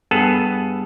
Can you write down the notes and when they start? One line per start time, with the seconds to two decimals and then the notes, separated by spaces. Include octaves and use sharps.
0.11 G2 B3 G#4 A4